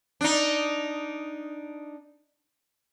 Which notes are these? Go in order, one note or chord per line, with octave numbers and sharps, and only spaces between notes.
D4 D#4